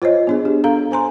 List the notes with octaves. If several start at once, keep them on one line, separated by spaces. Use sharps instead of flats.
F4 C5 C#5 D#5
B3 D4 G#4
G4
A4 F5 A#5
C5 G#5 A#5 C6